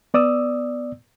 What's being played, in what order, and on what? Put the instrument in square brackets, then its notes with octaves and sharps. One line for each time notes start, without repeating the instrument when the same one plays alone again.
[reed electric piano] B3 D5 D#6 E6